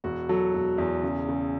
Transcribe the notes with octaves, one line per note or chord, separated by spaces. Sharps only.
E1 F#4
F#3 A4
E1
E2
C#3
C#3